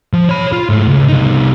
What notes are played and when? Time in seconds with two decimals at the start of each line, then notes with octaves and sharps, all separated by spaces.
0.13 F3
0.29 C#5 B5
0.52 F4
0.69 G#2 A3
0.88 C#2
1.09 C2 D#4